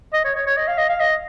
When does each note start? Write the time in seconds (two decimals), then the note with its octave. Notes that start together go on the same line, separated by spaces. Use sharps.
0.13 D#5
0.24 C#5
0.35 C#5
0.46 C#5
0.57 D#5
0.67 F5
0.78 D#5
0.89 F5
1.00 D#5